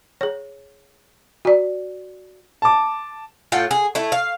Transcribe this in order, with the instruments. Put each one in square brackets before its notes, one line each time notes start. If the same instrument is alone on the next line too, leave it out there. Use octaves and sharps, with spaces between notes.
[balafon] G#4 C#5
F#4 D5
[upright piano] A5 D6
[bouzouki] A2 F4 F#5 G5
G#4
A3 E4
F5